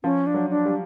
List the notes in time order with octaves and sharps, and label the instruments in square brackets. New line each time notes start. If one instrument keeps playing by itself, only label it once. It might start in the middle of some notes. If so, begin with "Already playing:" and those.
[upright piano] F3 [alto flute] C#4
[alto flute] D4
[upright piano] F#3
[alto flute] D4
[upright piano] G3